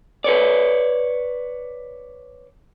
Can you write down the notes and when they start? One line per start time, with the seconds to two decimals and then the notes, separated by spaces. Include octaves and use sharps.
0.24 B4 C#5 D5